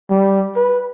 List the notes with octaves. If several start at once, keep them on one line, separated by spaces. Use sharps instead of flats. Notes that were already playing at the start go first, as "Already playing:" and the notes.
G3
B4